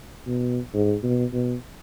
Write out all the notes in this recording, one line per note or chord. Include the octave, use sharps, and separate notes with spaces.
B2
G#2
B2
B2